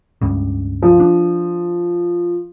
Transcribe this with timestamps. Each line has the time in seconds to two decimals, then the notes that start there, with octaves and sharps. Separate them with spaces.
0.22 C#2 G2 C#3
0.82 F3
1.00 D4